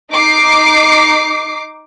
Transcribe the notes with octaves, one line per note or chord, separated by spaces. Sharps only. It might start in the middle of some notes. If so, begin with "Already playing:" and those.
D#4 D6 C7